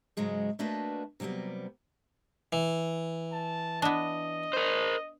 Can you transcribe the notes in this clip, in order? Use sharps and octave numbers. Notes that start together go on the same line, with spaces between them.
G#2 C#3 F#3 G#3 F#4
A3 A#3 D4 F#4 B4 D#5
C3 F#3 G3 A#3 B3
E3
A5
B3 D4 D#5
A#4 C5